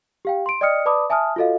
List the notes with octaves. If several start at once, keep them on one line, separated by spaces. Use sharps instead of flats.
G4 F5 G5
C6 D7
D5 D#5 G5 D#6 F6 C#7
B4 D5 A5 B5 D6 D#6
E5 G#5 A5 D#6 F6
F4 F#4 A4 D#5 F5